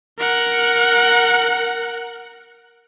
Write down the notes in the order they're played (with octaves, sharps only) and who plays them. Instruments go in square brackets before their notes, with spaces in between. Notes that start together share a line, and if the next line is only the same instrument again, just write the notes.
[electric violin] A#4 F#5